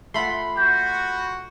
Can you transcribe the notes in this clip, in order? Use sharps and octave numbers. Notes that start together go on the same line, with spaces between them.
A3 F4 F#5 B5 C6
F#4 G6